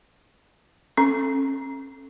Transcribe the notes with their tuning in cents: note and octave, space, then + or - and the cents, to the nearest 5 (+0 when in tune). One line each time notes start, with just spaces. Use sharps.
C#4 -40 A4 +0